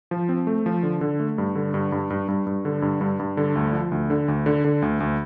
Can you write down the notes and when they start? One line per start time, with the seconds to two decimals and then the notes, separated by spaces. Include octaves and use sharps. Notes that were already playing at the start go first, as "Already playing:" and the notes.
0.11 F3
0.29 C4
0.47 A3
0.66 F3
0.83 D3
1.01 D3
1.20 A3
1.38 G2
1.55 D3
1.74 G2
1.92 G2
2.10 G2
2.28 G2
2.47 G2
2.65 D3
2.82 G2
3.01 G2
3.19 G2
3.37 D3
3.56 D2
3.73 F3
3.92 D2
4.10 D3
4.28 D2
4.46 D3
4.64 D3
4.82 D2
5.00 D2